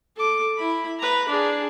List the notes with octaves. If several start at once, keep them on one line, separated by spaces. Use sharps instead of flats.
A4 D6
E4 B5
B4 A#5
D4 G#4